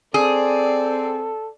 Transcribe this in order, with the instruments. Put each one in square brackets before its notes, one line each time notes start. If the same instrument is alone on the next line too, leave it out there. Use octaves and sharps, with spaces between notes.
[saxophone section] C4 [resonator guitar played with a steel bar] G#4 [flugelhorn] A4 [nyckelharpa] D5